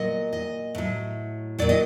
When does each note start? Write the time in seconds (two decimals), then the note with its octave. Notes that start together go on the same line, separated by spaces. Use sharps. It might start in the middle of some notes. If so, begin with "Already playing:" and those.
Already playing: A#2 F#3 D#5
0.33 D#5
0.75 A2 F#3
1.59 A#2 F#3 D5
1.69 D#5